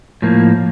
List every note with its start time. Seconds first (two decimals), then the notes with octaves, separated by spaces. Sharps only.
0.22 A2 F3 A#3